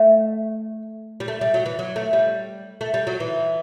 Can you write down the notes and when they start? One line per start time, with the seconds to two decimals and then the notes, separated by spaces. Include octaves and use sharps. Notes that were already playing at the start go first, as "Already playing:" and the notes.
Already playing: A3
1.20 G3
1.28 A3
1.41 G3
1.54 F#3
1.66 E3
1.79 F#3
1.96 A3
2.13 G3
2.81 A3
2.94 G3
3.07 F#3
3.20 E3